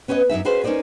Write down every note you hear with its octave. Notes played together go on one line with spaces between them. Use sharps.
B3 C#4 B4 C#5 D#5
F#2 C#3 D#4 E5
C#4 F#4 G#4 B4 C5
C#4 D#4 A#4 C5 D5 D#5